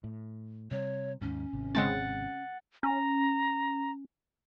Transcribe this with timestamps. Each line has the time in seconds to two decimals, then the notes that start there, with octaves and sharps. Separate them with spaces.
0.04 A2
0.71 C3 G3 C#5
1.21 D#2 G#2 C#4
1.53 G#1 C3
1.75 C#3 G#3 C4 F#5 A6
2.83 C#4 A#5